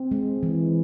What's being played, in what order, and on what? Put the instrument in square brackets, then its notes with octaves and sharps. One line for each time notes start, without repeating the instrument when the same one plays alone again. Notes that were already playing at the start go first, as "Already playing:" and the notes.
Already playing: [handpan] C4
G#3
E3